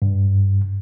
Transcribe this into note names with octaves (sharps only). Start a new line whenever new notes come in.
G2